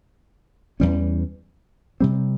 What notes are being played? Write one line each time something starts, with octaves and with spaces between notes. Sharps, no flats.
E2 E3 G3 C#4
C3 G3 C4